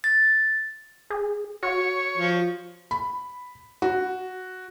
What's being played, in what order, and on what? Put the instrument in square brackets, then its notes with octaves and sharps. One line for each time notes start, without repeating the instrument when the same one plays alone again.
[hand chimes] A6
[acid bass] G#4
[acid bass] F#4 [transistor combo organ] C#5
[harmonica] F3
[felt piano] B5
F#4